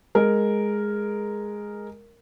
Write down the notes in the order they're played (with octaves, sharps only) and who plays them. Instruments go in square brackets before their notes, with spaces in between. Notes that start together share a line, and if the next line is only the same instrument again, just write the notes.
[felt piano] G#3 A#4